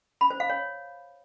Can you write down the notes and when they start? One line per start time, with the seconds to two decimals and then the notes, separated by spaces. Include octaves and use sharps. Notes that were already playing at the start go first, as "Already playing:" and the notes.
0.21 B5
0.30 C5
0.40 F5
0.50 C#5